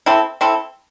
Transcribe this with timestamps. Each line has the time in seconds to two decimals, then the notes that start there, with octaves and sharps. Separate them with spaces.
0.06 C4 E4 A4
0.41 C4 E4 A4